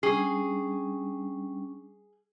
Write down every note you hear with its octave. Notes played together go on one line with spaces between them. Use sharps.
G3 C#4 D4 G#4